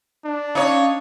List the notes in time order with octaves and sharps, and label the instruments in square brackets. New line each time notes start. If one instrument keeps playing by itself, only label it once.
[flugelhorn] D4
[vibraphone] C#4 F5 [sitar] D#4 C#5